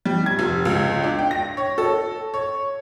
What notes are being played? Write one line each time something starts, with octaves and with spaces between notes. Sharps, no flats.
G3
G#6
F1
C#2
D4
G5
A#6
C#5
A4
C#5